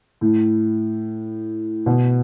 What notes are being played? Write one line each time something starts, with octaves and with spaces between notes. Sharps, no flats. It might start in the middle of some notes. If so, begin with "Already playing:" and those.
A2
B2